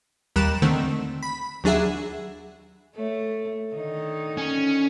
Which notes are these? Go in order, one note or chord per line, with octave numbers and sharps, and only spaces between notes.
D#2 G3 A#4 F#6 E7
D3 D#3 A3 C4
B5
D#2 F#3 D4 G#4 E5 F#5
A3 A4 C#5
D3 D#3 D#4
C#4